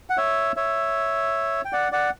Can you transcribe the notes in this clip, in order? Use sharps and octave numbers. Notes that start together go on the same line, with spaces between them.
F#5
C#5 E5
C#5 E5
G5
D5 F#5
D5 F#5